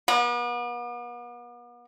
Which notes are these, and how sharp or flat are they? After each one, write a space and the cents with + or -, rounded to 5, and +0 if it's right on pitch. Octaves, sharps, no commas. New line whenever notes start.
B3 -40